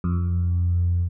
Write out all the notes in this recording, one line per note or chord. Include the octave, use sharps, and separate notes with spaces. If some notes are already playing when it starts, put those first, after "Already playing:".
F2